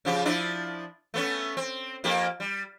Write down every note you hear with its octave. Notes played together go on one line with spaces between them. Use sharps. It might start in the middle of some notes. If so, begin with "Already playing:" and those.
C#3 F3 G4
F3 D4 E4
A3 B3 C#4
C4
F2 A#3 G4
G3